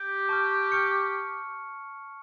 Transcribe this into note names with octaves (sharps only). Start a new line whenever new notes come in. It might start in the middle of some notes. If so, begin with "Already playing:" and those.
Already playing: G4
A5 C#6 F6
C#6 F6 C#7